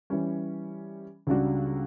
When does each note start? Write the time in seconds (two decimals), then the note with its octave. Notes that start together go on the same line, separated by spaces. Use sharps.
0.10 E3 G3 C#4
1.27 C#2 C#3 G3 D4 F#4